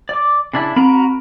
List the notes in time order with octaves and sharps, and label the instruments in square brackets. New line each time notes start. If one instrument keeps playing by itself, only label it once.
[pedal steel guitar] D5 D6
C#3 D4 E4
[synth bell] C4 [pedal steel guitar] F#4 A#5 B5